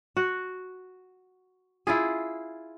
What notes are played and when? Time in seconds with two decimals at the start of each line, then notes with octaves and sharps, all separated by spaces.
0.17 F#4
1.87 E4 F4 G#4